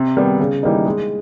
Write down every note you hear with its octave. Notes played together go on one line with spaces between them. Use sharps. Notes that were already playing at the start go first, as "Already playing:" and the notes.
Already playing: C3
D#3 G3 B3
C#3
E3 G3 A#3 D#4
G#3